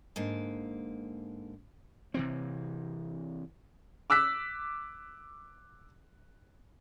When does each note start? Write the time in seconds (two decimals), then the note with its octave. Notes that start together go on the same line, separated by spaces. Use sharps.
0.16 G#2 D3 A#3
2.14 C3 E3 C4
4.10 D6 E6 F#6 B6